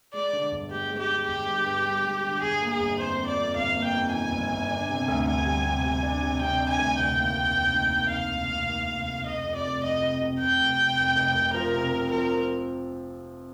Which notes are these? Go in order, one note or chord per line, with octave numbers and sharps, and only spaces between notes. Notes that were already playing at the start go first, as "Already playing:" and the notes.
G#3 D5
D3
G1
G#3 G4
G#3
G4
D3
G1 G4
G2
G2
G2
G#3
D3
G1 G#4
A#3
G#4
G1
F2 C5
F2
D5
F2
G1 F5
A#3
G5
F2
D#3 G#5
G1
G1
D4
C3
D2
D2 G#5
G3
C3
G3
D4
C3
C3 G5
D4
G#5
D2
F1 G5
D#2
F1
F1
D#3
D#2
D#3 F5
F1
F1
D#2
F1
F1
F1 D#5
F2
D5
F1
F2 D#5
C3
C3
F1 G5
F1
C3
F1
F1
F1
F3 A#4
C3
C3
F3 A#4
C4